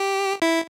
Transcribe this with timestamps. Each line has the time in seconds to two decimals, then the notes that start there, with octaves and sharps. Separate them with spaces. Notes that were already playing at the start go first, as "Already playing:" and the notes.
Already playing: G4
0.42 E4